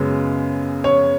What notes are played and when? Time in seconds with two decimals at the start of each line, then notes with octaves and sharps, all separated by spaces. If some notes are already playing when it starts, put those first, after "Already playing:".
Already playing: F#2 C#3 G#3 B3
0.84 C#5